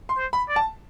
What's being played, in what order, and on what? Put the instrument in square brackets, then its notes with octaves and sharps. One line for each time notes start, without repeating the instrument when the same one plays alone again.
[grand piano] C6
[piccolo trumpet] C5
[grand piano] B5
[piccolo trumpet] D5
[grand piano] A5